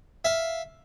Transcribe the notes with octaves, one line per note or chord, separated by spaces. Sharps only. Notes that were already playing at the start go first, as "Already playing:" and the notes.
E5 F5